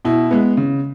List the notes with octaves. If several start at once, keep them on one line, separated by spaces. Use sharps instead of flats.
B2 E4
G#3 B3
C#3